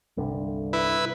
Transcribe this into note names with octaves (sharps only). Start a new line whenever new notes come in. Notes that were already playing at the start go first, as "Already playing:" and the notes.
G1 C2 D3
E4 B4